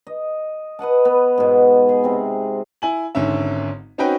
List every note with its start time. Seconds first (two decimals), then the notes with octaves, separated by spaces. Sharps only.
0.07 D#5
0.79 B4 D#5 F#5 A5
1.05 B3
1.38 G#2 B2
1.89 G#4
2.04 C3 C4
2.82 E4 G#5 F#7
3.15 G#1 G#2 D3 C#4 E5
3.98 C4 C#4 D#4 F#4 B4 G5